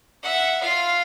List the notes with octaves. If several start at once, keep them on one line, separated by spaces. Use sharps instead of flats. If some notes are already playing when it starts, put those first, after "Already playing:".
E5 F#5
F4 F5